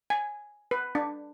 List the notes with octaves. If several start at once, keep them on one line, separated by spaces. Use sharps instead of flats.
G#5
B4
D4